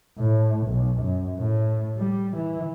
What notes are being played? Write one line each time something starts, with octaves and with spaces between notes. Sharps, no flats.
A2
B1
F#2
A2
G3
E3